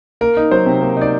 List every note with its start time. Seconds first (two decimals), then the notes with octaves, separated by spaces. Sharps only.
0.21 A#3 A#4
0.37 D#4
0.51 F#3 C5
0.66 C3
0.81 A#3
0.97 D#4 D5